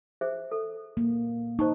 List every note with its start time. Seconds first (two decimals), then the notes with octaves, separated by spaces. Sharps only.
0.21 G#4 C5 E5
0.51 A4
0.97 A#3
1.59 D#4 C5 A5 C#6